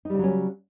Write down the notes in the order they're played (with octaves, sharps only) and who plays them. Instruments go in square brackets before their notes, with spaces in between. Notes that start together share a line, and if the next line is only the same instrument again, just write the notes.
[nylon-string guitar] D#4
G3
C#3
F#3
C#4